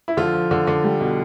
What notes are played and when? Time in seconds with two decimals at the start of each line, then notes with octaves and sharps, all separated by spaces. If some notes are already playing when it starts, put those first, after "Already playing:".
0.08 E4
0.17 D3 F3 F4
0.34 F3
0.51 D3
0.67 D3
0.84 G3
1.01 B2